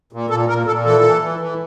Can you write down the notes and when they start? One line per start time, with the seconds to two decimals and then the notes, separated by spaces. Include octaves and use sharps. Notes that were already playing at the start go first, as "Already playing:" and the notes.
0.13 A#2
0.30 A#2 A4
0.49 A#2 A#4
0.67 A#2 A4
0.85 E3 A4
1.04 E3
1.21 E3
1.39 E3